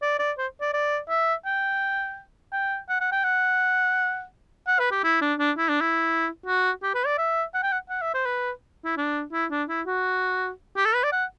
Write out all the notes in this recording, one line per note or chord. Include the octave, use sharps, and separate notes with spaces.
D5
D5
C5
D5
D5
E5
G5
G5
F#5
F#5
G5
F#5
F#5
B4
G4
E4
D4
D4
E4
D4
E4
F#4
G4
B4
D5
E5
F#5
G5
F#5
F#5
E5
C5
B4
E4
D4
E4
D4
E4
F#4
G4
A4
B4
D5
F#5